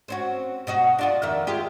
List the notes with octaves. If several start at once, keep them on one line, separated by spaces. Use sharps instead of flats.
C4 C#4 F#4
B2 D#4 F#4
D4 F4 F#4
F2 D#3 E5
F4 G4 G#4